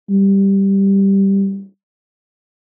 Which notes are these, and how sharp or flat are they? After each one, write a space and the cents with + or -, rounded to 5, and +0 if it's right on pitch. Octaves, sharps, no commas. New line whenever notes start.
G3 +0